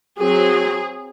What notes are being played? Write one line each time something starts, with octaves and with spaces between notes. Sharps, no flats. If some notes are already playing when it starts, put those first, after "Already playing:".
F#3 C4 G#4